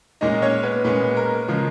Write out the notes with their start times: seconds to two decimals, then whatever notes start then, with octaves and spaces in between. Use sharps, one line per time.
0.21 A#2 G#3 C#4 D#4 D#5
0.42 C#4 C#5
0.63 B3 B4
0.85 A#2 G#3 B3 C#4 B4
1.17 A#4
1.48 C#3 F3 G#3 A#4